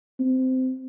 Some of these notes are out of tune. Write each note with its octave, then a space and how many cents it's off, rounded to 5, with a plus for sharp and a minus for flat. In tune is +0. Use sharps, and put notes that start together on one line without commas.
C4 -20